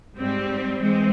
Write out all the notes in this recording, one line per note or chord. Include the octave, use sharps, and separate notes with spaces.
G#2 G3 C4
E3 G#3 C4